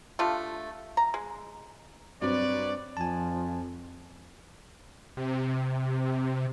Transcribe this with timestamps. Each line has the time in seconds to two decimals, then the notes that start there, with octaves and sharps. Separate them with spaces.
0.19 A3 D4 F4 G4
0.97 A#5
1.14 G#3
2.21 G2 F#3 C4 B4 C#5 D5
2.97 F2 F3 G#5 A5
5.17 C3